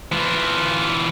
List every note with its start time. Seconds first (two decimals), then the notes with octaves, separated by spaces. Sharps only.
0.12 E3 F4